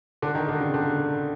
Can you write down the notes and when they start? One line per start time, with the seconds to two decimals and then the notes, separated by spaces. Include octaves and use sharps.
0.22 D3
0.35 D#3
0.48 D3
0.60 C#3
0.74 D3